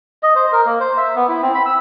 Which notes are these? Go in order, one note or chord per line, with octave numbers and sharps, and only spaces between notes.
D#5
C5
A#4
A#3
C5
E5
B3
E4
C4
B5
E6